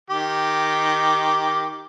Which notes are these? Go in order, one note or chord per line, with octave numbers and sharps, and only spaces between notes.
D#3 G4 D6